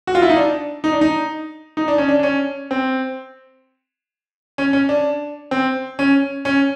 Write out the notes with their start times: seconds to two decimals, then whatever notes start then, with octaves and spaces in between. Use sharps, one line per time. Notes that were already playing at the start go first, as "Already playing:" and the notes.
0.07 F#4
0.15 F4
0.22 E4
0.30 D#4
0.36 D4
0.84 D#4
0.92 D4
1.01 D#4
1.77 D#4
1.88 D4
1.98 C#4
2.09 D4
2.19 D4
2.23 C#4
2.71 C4
4.58 C#4
4.73 C#4
4.89 D4
5.51 C4
5.99 C#4
6.45 C#4